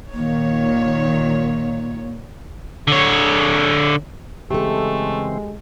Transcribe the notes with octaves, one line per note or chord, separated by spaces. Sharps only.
A#2 D#3 A#3 C#5
D3 C#5
C#3 E3 G#3 A3 C4 G4 A4